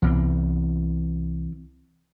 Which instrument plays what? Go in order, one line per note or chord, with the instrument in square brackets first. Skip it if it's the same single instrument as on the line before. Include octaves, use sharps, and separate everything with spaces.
[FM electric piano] C2 [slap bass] E3 B3 C4